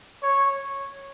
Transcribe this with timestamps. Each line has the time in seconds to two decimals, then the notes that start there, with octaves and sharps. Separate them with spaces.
0.23 C#5